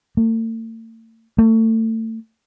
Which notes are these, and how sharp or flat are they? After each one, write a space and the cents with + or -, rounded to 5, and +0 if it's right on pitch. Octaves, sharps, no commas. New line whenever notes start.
A3 +45
A3 +30